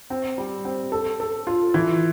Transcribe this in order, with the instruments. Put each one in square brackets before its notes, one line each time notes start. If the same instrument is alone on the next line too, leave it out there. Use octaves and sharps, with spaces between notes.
[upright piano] C4
G3
C4
A4
A4
F4
E3